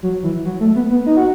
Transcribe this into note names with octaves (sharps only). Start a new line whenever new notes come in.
F#3
E3
F#3
A3
B3
B3
D#4
F#4